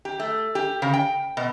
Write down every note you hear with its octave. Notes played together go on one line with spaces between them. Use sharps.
G4
A3
G4
C#3
G5
B2